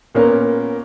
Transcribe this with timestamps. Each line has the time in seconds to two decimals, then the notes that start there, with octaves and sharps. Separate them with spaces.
0.15 A#2 A#3 B3 C#4 A#4